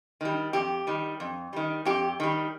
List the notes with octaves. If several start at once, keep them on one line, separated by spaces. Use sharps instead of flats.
D#3 G3
F2 G4
D#3 G3
F2
D#3 G3
F2 G4
D#3 G3